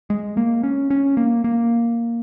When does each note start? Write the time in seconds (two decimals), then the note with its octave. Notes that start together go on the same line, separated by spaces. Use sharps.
0.10 G#3
0.37 A#3
0.63 C#4
0.90 C#4
1.17 A#3
1.44 A#3